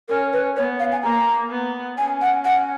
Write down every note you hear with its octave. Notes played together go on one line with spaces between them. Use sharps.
C#4 A#4
B4
B3 C#5
F5
G#5
A#3 A#5
B3
C#4 G#5
F#5
F#5